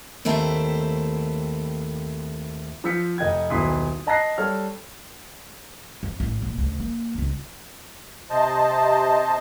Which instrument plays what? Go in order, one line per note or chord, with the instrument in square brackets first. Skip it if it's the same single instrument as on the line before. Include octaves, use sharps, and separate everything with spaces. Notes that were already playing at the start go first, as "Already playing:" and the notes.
[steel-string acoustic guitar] D#2 A3 C4 E4 E5 A#5
[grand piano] F3 C5 E6 B6 C#7
F1 D#5 G5 G#6
D#1 B1 E4 C6 D#6 B6
D#5 A5 A#5 F#6 A#6 C7
G3 A4 C#5 F6
[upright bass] F2
A1
A#2
D2 C#3
A#3
G1 C#2
[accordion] C3 C5 D#5 A5